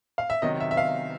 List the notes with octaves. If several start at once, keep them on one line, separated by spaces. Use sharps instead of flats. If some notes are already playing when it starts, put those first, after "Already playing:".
F5
E5
C3 D#3 F#3 D#5
E5
E5
F5